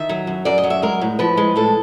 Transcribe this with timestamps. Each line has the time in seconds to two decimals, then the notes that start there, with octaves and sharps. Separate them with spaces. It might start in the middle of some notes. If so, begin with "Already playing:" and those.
Already playing: D#3 E5
0.09 F#3
0.27 F#2
0.45 F#2 D5
0.58 D#5
0.64 F#3
0.70 E5
0.82 G#3 A#4
1.01 A2
1.19 F3 B4
1.37 G#3
1.56 A2 A4